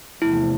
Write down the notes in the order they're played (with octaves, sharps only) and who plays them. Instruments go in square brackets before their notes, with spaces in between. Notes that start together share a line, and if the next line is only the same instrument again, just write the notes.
[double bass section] E2 C3 F3 A3 [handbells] E4